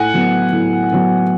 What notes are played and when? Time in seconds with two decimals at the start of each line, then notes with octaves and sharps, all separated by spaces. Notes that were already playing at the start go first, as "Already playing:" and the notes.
Already playing: A2 F#5 G#5
0.14 F#3 B3
0.53 A2
0.92 F#3 B3